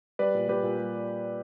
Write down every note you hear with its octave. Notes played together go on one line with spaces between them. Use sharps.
G3 B4 D5
A#2
G3 G4 B4
A#2
G3